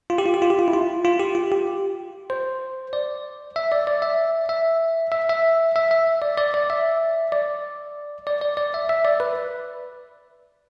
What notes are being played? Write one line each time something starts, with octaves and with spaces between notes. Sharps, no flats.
F4
G4
F4
G4
F4
G4
F4
E4
F4
F4
G4
F4
G4
C5
D5
E5
D5
D5
E5
E5
E5
E5
E5
E5
D5
D5
D5
E5
D5
D5
D5
D5
E5
E5
D5
B4